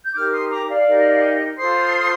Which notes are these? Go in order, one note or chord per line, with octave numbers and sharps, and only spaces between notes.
G6
D#4 G4 A#4 D6 F6
C6 D#6
A#5 D6
D5 F5
D#4 G4 A#4
F4 A4 C5 C6 D#6